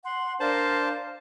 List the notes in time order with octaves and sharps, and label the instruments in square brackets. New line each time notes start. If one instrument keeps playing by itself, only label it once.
[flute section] F#5 C6
[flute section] D4 A#4 F5 [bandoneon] C5 A5